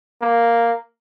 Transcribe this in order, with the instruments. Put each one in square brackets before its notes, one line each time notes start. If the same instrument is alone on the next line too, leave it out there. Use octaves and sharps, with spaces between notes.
[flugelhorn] A#3